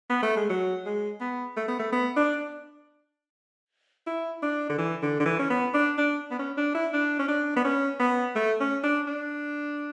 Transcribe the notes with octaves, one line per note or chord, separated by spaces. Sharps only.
B3
A3
G#3
F#3
G#3
B3
A3
B3
A3
B3
D4
E4
D4
D3
E3
D3
D3
E3
C#4
B3
D4
D4
B3
C#4
D4
E4
D4
C#4
D4
B3
C#4
B3
A3
C#4
D4
D4